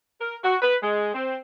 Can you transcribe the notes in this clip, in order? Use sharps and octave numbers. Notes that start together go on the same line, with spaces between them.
A#4
F#4
B4
G#3
C4